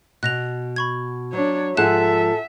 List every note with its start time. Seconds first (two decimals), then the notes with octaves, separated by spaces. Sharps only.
0.23 B2 F#6 A#6 F7
0.76 B5 C#6 G#6
1.33 F#3 D4 C#5
1.77 G#2 F3 G#4 A4 E5 F#5 F#6 E7